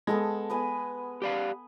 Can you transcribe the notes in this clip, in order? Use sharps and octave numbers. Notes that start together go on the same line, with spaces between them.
G#3 B3 A4 A5
B3 B4 G#5
G4 D5 F5